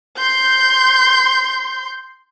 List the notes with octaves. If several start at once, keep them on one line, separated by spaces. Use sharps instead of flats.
C6 G6